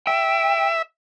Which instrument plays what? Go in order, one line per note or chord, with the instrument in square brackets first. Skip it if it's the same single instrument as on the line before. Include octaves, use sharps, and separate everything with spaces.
[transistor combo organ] E5 [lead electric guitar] G5